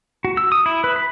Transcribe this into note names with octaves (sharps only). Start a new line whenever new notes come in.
F#4
E6
D#6
E4
B4
B5